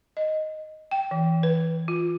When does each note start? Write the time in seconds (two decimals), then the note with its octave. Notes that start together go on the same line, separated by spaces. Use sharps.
0.17 D#5
0.91 G5
1.11 E3
1.43 B4
1.88 F4